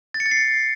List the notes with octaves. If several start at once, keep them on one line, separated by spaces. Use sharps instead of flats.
A6
C#7
A6
C7
C#7